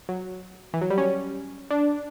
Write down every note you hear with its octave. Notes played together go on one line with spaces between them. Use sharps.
F#3
E3
F#3
G3
C#4
D4